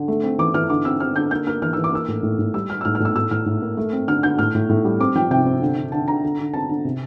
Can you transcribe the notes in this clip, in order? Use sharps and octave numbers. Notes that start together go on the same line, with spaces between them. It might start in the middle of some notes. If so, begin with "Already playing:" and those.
Already playing: D3
A3
C4
E3 D6
E3 F6
D3 D6
C4 E6
C4 F6
D3 G6
A#3 G6
A#3 F6
E3 F6
E3 E6
D6
A#3 E6
A2
A2
A2
G3 E6
G3 F6
E6
A2 F6
F6
A2
E6
A2 E6
A2 F6
A2
A#3
A3
C4
D3 F6
D3 G6
A2 F6
A2
A2
G3
C4 D6
F3 G5
C3 G5
C4
D3
D3
D3 A5
D3 A#5
D3
D3
C4 A5
D3
C3